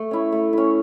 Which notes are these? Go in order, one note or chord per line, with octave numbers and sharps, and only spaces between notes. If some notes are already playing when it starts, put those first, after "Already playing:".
Already playing: A3
C#4 E4
A3
C#4 E4